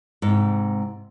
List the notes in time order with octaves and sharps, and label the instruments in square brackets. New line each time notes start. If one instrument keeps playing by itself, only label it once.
[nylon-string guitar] G#2 C3